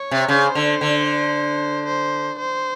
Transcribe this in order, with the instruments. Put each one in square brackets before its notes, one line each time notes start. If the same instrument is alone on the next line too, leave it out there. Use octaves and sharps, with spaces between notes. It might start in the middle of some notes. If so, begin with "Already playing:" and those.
Already playing: [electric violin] C#5
[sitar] C3
[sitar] C#3 [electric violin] C5
[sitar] D3
D3
[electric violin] C5
C5